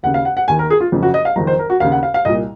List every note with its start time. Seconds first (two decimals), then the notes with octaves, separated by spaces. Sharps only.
0.03 D#2 C#3 F#5
0.14 F5
0.25 F#5
0.37 F#5
0.48 D#2 D#3 G#5
0.59 A#4
0.70 G#4
0.80 F4
0.92 F#1 F2 C#3
1.03 F#4
1.14 D#5
1.25 F5
1.36 F#1 F2 D#3 A#5
1.47 C5
1.59 A#4
1.70 F#4
1.80 D#2 C#3 F5
1.92 F#5
2.03 F5
2.14 F5
2.25 C2 A#2 D#5